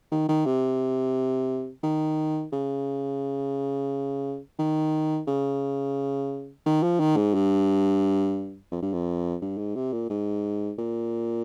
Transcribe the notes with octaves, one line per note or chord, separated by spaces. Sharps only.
D#3
D#3
C3
D#3
C#3
D#3
C#3
D#3
F3
D#3
G#2
G2
F2
G2
F2
G2
G#2
C3
A#2
G#2
A#2